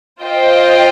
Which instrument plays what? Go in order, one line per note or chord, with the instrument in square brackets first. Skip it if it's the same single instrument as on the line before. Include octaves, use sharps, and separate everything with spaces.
[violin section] F4 C5 D#5 G5